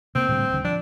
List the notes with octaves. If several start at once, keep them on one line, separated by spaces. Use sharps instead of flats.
C3 A#3 C4
A2 D3 G3
D#1 D3
F3 D4